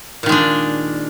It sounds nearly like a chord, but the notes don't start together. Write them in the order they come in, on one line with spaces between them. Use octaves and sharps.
A#2 D#3 G#3 D4